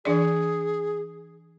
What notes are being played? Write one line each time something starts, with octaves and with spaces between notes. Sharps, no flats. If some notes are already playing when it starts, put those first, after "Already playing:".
E3 D4 G#4 D5